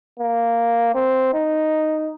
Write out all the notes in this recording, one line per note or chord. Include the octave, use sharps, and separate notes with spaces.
A#3
C4
D#4